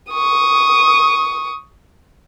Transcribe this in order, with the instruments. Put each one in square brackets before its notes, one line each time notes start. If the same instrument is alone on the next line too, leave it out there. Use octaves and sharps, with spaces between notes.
[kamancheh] C#6 D#6